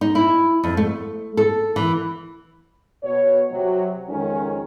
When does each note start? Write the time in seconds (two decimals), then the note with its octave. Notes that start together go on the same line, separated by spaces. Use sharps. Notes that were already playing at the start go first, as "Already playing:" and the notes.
0.01 D#4
0.15 E4
0.64 F2
0.77 A3
1.37 A4
1.76 E3
3.04 B2 C#5
3.51 C3 F#3
4.08 F2 D#3 G#3 C#4